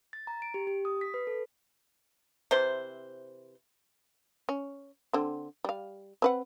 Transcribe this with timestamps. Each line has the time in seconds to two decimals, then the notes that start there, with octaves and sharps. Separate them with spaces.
0.13 A6
0.27 A#5
0.42 D7
0.54 G4
0.67 G4
0.85 D#6
1.01 B6
1.14 B4
1.27 A4
2.51 C3 E3 C5 C6
4.49 C#4
5.13 D3 C4
5.64 G3 F5
6.22 C4 B4 F#5